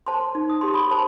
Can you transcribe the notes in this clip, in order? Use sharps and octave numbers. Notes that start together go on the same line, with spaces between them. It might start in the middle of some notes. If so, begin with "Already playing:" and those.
C5 A5 C6
D#4
D#6
G4 C6
B5 D#6
C5 A5 C6